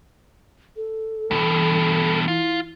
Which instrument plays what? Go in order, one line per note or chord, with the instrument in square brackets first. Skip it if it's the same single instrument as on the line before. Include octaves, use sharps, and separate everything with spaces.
[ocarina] A4
[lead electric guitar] G2 B2 [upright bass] E3
[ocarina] E4 [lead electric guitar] F4